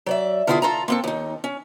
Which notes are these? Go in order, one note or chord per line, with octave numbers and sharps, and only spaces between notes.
F#3 D5 E5
D3 B3 E4 F4 G#4
F4 A4 A#5
A#3 C4 A4
D#2 D#4
C#4